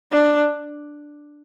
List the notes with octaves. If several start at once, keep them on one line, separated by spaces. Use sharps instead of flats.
D4